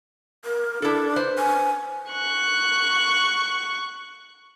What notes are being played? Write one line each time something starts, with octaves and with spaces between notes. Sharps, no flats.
A#4
D4 E4 A4
B4 C5
G#5
C#6 F#6